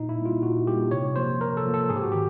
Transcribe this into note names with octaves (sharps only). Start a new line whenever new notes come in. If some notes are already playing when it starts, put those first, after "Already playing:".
Already playing: A#2 D#4
E4
G3 A#3
F4
A#2 F#4
G3 A#3 G4
C3 C#5
F3 A#3 C5
C3 A#4
A4
F3 A#3
A4
G#2 G#4
G4
F#4
D#3 G4